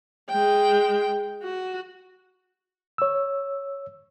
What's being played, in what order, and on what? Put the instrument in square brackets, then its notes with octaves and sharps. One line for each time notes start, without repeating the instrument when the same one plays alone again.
[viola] G#3 G5
F#4
[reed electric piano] C#5 E6